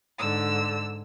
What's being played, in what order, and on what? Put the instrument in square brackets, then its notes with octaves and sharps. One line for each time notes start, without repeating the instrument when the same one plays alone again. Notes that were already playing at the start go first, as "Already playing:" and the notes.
[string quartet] G#2 D3 E6